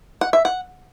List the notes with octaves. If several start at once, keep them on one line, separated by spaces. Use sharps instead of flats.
F#5
E5
F#5